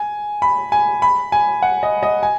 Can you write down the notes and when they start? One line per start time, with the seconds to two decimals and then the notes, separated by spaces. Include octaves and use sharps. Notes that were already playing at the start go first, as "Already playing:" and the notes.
Already playing: G#5
0.42 B5
0.72 G#5
1.02 B5
1.32 G#5
1.62 F#5
1.83 D#5
2.03 D#5
2.23 G#5